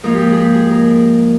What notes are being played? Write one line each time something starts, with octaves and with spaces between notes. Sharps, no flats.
G#2 F3 A#3 A#4
G4
G#4
G4 G#4
G#4
A#4